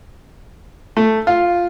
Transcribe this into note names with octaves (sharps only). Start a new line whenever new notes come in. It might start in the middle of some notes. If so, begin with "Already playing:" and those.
A3
F4